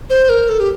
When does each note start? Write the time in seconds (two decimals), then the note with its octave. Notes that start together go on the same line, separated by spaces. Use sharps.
0.10 C5
0.29 A#4
0.49 A4
0.60 G4